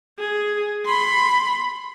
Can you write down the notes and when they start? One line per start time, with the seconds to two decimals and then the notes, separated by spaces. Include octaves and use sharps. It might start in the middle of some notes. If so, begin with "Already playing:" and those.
0.19 G#4
0.85 B5 C6